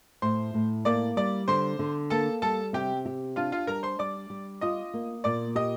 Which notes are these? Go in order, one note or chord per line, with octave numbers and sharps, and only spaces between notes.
A2 C5 C6
A2
A#3 D5 D6
G3 D5 D6
D3 C5 C6
D3
A#3 A4 A5
G3 A4 A5
C3 G4 G5
G4
D4 F4 F5
F4 F5
G3 A#4 A#5
C5 C6
G3 D5 D6
G3
F4 D#5 D#6
A#3
A#2 D5 D6
G4 D#5 D#6